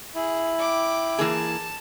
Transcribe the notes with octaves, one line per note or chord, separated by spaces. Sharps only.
E4 G#4
G5 D6
E3 A#3 G#4 A5